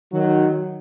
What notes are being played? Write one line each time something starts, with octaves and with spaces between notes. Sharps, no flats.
D#3 F#3